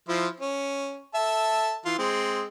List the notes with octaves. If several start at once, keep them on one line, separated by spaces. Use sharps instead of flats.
F3 E4 C5
C#4
A4 E5 A5
E3 F4
G#3 C4